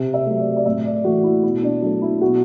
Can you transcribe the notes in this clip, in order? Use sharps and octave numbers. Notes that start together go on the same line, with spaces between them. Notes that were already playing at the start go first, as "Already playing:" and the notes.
Already playing: C3
E5
F#3 A3
D5
D5
A2 E5
D5
E3 A3 F#4
E4
B2 E4
D4
F#3 A3 D4
E4
B2 F#4